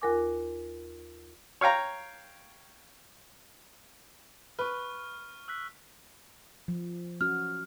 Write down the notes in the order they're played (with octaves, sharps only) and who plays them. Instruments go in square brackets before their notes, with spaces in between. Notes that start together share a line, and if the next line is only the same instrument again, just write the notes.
[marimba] D#2 F4 A#4 G#5 D6
[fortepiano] C#5 F5 G5 A#5
[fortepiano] B4 [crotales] C#6 F6
[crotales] E6 F#6 B6
[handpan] F3
[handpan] C#4 F#4 [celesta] F6